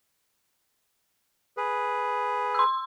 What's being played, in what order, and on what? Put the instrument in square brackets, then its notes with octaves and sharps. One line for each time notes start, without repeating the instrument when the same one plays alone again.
[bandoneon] G#4 B4
[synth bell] C6 E6